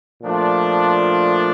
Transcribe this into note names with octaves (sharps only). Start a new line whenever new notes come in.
A#2 F3 A3 D4 F4